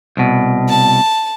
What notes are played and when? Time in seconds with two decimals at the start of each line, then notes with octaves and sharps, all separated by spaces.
0.17 C2 B2
0.69 A5